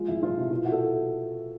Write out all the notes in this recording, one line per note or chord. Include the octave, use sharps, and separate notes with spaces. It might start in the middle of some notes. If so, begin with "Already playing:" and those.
Already playing: F3 G#3 F4
F2 E4
F3 F4
C3 E4
B2 F4
E4 F#4
A4